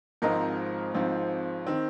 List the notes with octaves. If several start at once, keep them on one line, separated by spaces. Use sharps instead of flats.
G#1 G#2 F3 C4 A#4 D#5
G#1 G#2 F3 C4
D#3 C4